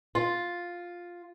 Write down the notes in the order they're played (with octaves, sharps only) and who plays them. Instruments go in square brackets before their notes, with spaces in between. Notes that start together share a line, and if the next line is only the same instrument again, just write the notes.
[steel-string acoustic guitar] F4